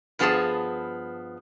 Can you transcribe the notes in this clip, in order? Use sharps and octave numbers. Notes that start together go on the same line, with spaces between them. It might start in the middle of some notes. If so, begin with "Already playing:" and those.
G2 F3 B3 G4 G#4 A5